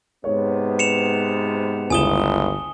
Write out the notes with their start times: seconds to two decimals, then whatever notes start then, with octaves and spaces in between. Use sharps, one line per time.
0.24 G#2 C3 B3 C#5
0.79 C#7 E7 F7
1.90 G1 C#2 E4 G#5 D#6 E7 G7